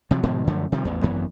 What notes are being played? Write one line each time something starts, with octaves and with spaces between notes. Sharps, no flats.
C3 F3 F#3
G#2 B2 D#3 F3
F#2 D3 F3 A3
C3 D#3 F3 G3
A1 E2
G#1 F#2 E3 B3